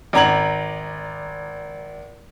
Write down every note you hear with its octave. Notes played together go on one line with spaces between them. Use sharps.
G#1 D5 A#5 G#6 F#7